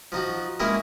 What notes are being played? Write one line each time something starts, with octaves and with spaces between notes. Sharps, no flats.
F3 D#4 F#4
G#3 A#3 C#4 E4 G#4 A#4